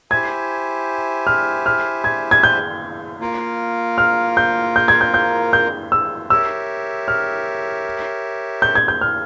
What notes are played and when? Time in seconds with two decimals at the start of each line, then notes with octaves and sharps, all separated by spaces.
0.10 E4 G4 C5 E5 G#5 G#6
1.27 F6
1.66 F6
2.04 G#6
2.31 G#6
2.43 G6
3.20 A#3 F4 A#4
3.98 F6
4.37 G6
4.76 G6
4.88 G#6
5.01 G6
5.14 G6
5.53 G6
5.92 E6
6.30 G4 A#4 C#5 E5 E6
7.08 F6
8.62 G6
8.75 G#6
8.88 G6
9.01 F6